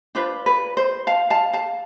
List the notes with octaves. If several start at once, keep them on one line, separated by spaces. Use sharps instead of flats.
D4 F4 B4 C5
B4
C5
F5 A5
F5 A5
F5 A5